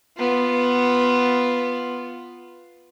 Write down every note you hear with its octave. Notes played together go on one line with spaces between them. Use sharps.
B3 F4